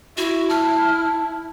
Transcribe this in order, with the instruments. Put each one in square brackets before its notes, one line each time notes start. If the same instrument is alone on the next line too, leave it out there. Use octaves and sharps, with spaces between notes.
[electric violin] E4 [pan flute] F#4
[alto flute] A5 [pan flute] F6